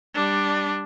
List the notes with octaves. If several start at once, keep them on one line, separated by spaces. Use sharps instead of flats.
G3 D4